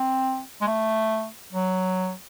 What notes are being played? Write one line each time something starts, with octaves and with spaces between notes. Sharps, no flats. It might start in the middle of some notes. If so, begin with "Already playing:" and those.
Already playing: C4
G#3
A3
F#3